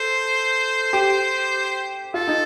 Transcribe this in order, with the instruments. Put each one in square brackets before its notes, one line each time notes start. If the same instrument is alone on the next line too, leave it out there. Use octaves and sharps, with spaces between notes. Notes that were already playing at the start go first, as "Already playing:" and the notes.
Already playing: [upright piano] A4 [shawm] C5
[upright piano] G4
[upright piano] F4 [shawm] A4
[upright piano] D#4